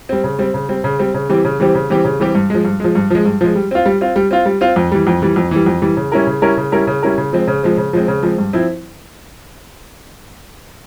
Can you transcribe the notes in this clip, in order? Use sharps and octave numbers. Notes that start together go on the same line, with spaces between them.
G3 C4
C#3
G3 C4
C#3
G3 C4
C#3
G3 C4
C#3
E3 G3 C4 G4
C#3
E3 G3 C4 G4
C#3
E3 G3 C4 G4
C#3
E3 G3 C4 G4
G2
F3 G#3
G2
F3 G#3
G2
F3 G#3
G2
F3 G#3
G3
C4 F4
G3
C4 F4
G3
C4 F4
G3
C4 F4
F2
E3 G3
F2
E3 G3
F2
E3 G3
F2
E3 G3
C#3
G3 C#4 E4 A#4
C#3
G3 C#4 E4 A#4
C#3
G3 C#4 E4 A#4
C#3
G3 C#4 E4 A#4
C#3
F3 G#3 C4
C#3
F3 G#3 C4
C#3
F3 G#3 C4
C#3
F3 G#3 C4
G2
F3 C4 E4